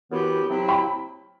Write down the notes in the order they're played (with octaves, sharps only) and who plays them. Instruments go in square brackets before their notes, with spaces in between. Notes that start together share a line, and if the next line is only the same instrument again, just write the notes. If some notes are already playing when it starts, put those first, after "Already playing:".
[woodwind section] F#2 E3 B3 E4 G4
C3 F#3 C4 E4
[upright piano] G5 B5